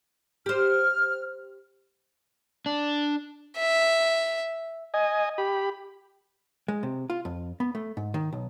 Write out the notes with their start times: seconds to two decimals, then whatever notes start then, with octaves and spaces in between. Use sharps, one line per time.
0.46 G4 C5 F6
2.66 D4
3.58 E5
4.94 D#5 G#5
5.38 G4 B5
6.68 G#3
6.83 C3
7.10 F4
7.25 F2
7.60 B3
7.75 A3
7.97 G#2
8.14 D#3
8.33 B1